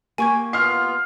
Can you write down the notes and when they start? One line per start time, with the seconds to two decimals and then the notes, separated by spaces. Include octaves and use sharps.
0.18 A#3 G4 G#5 C#6 G#6
0.53 B3 F4 F6 C7